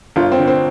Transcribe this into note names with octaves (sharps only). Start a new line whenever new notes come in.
G1 F4
C4
D3
C4